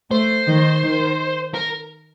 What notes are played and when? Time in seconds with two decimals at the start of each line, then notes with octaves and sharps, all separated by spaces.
0.11 A3 C5
0.46 D#3
0.82 D#3
1.54 A#4